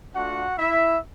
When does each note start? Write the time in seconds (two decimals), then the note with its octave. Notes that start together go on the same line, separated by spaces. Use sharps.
0.14 A3 D4 F4 F#4 F#5
0.58 E4 E5